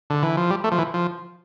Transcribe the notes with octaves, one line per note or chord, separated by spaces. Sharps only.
D3
E3
F3
G3
A3
F3
E3
F3